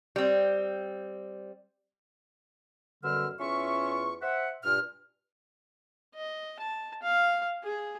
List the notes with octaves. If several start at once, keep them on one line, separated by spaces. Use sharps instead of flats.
G3 C4
F#2 B2 D3 G3 E6 F6
E2 C#4 F4 E5 C#6
C5 E5 F#5
G2 A#2 F6
D#5
A5
F5
G#4